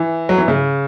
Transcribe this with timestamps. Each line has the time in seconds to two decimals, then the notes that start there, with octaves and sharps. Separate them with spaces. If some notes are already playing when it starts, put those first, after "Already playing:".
Already playing: E3
0.29 F#3
0.38 E3
0.48 C#3